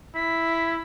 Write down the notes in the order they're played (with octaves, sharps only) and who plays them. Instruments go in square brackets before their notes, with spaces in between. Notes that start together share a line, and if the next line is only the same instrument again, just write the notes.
[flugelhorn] E4 [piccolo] B6